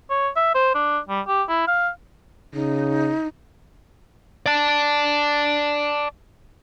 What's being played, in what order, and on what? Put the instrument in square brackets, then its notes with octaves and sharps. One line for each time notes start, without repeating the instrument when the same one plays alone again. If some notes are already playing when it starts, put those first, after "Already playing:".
[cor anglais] C#5
E5
C5
D4
G3
G4
E4
F5
[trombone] C#3 [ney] D#4
[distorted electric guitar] D5 A5